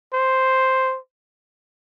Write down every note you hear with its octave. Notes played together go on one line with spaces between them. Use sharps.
C5